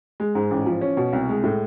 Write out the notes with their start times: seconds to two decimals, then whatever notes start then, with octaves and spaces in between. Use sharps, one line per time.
0.20 G#3
0.35 G#2
0.51 A1
0.66 F3
0.81 C#4
0.97 B2
1.13 C2
1.29 G#3
1.44 A2